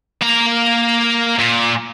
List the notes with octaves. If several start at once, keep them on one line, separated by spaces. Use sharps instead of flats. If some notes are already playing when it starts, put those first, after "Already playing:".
A#3 A#5
A#2